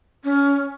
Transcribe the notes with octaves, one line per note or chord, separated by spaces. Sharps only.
C#4